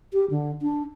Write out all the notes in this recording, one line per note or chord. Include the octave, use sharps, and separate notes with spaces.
G4
D3
D4